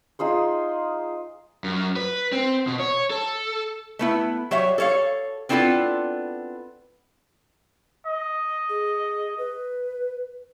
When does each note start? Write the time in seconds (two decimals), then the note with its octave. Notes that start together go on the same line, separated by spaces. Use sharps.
0.19 D#4 F4 G#4 C5
1.64 F#2
1.96 B4
2.32 C4
2.67 B2
2.79 C#5
3.10 A4
3.99 A3 B3 E4
4.51 F#3 G3 C#5 E5
4.78 A4 C#5 F5
5.49 B3 C4 D4 E4 F4 A4
8.06 D#5
8.69 G#4
9.38 B4